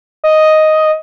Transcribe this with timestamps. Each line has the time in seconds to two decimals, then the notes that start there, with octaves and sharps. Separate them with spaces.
0.24 D#5